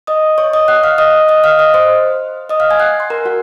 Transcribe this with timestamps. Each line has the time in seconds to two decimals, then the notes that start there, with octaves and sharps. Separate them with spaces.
0.07 D#5 D#6
0.38 C#5 C#6
0.53 D#5 D#6
0.68 F#5 F#6
0.83 F5 F6
0.98 D#5 D#6
1.29 D#5 D#6
1.44 F5 F6
1.59 D#5 D#6
1.74 C5 C6
2.49 D#5 D#6
2.60 F5 F6
2.70 G#5 G#6
2.80 F#5 F#6
3.00 C6
3.10 A#4 A#5
3.25 F#4 F#5